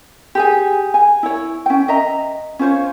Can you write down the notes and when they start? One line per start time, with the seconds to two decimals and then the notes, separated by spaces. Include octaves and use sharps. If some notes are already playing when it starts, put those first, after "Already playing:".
0.35 G4 G#4 G#5
0.94 G#5
1.23 E4 C#5
1.66 C#4 G5
1.88 D#5 E5 A#5
2.59 C#4 F4 C5 C#5